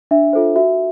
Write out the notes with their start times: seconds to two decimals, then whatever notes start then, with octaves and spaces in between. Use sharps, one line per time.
0.11 D4 E5
0.33 F4 A4 C5
0.56 F#4 E5